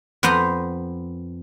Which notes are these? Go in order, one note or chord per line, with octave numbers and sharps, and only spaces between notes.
F2 B3 B4 C5 A#5